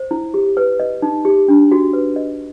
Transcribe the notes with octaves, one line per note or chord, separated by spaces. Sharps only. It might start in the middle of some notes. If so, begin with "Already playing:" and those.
Already playing: C5
E4
G4
B4
D#5
D#4
G4
D4
F#4
B4
D#5